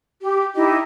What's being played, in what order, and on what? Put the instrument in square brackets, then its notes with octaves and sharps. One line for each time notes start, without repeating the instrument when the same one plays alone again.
[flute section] G4
D#4 E4 G4 D#5